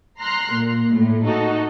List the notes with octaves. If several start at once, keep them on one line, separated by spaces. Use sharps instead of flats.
A#5 C6 F6 F#6
A#2
A2
D#4 F#4 A4 D#5